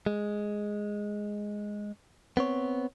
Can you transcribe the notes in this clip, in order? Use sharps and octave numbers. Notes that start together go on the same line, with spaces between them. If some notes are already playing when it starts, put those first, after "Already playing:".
G#3
B3 C4 C#5